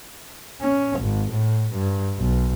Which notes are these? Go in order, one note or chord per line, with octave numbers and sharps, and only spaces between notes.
C#4
G#1
A2
G2
B1